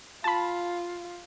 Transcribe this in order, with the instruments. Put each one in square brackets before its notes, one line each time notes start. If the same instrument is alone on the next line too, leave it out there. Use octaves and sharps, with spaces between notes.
[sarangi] F4 [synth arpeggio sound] A5 B5